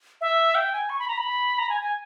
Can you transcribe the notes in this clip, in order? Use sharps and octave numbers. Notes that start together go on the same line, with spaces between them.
E5
G5
G#5
C#6
B5
A#5
B5
A#5
G#5
G#5